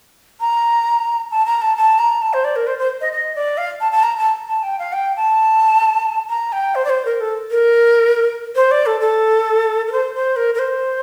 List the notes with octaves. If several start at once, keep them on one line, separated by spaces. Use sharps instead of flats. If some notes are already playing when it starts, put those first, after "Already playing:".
A#5
A5
A#5
A5
A5
A#5
A5
C5
D5
A#4
C5
C5
D#5
D#5
D5
F5
A5
A5
A#5
A5
A5
G5
F5
G5
A5
A#5
G5
C5
D5
C5
A#4
A4
A#4
C5
D5
A4
A4
A#4
C5
C5
A#4
A#4
C5